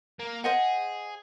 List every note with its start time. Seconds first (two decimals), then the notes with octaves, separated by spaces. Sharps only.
0.20 A#3
0.44 G#4 C5 D#5 F#5